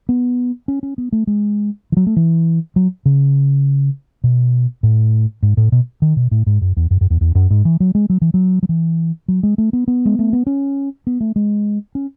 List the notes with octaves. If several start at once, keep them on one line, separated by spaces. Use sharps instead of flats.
B3
C#4
C#4
B3
A3
G#3
E3
F#3
A3
E3
F#3
C#3
B2
A2
G#2
A2
B2
D#3
B2
A2
G#2
F#2
E2
F#2
F#2
E2
E2
F#2
G#2
E3
F#3
G#3
F#3
E3
F#3
F#3
E3
F#3
G#3
A3
B3
B3
G#3
A3
B3
C#4
B3
A3
G#3
C#4